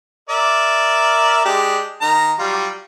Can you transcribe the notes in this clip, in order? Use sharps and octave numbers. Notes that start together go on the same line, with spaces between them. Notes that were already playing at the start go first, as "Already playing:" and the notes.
A#4 D5 E5
G#3 D4 G4
D#3 A#5
F#3 G3 F4